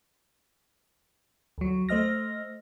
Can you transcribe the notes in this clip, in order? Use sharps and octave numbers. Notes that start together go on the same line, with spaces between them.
D2 F#3
A3 C5 D#5 F6 A#6